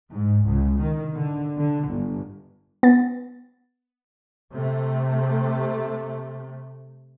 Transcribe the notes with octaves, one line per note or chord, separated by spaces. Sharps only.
G#2
C#2
D#3
D3
D3
G1
B3 A6
C3 A3